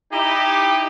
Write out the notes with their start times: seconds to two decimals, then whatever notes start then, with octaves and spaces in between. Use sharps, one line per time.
0.12 D#4 E4 G4